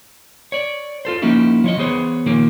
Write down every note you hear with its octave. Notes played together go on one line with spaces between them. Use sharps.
C#5 D5
F4 A4 C5
F3 A#3 C#4 D#4 E4 F#4
F3 C#5 D#5
E3 B3 G#4 C5 C#5
A#2 D#3 F3 A#3